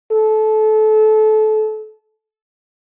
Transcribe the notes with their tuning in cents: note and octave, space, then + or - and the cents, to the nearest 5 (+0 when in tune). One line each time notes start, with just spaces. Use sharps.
A4 -25